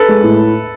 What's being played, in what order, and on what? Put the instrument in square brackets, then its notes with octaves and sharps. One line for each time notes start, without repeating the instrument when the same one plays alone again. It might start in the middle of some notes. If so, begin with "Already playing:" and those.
Already playing: [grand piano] A4 B4
[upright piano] G#3
A2